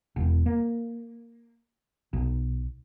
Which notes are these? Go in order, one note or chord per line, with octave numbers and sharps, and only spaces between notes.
E1
A#3
B1